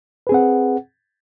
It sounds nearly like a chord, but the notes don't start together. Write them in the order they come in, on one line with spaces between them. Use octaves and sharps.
B4 G#4 C4 F#5